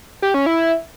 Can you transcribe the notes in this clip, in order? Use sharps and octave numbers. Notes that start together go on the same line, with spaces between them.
G4
C#4
E4